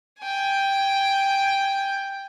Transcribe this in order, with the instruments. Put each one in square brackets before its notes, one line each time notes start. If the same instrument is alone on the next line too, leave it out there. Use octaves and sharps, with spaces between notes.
[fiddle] G5 G#5